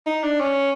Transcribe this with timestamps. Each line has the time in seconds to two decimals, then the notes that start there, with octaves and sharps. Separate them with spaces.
0.06 D#4
0.23 D4
0.40 C#4